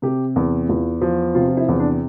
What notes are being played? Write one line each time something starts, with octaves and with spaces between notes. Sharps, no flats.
C3 G4
E2
E2 F4
F3
C3 F4
F4
E4
E2
D4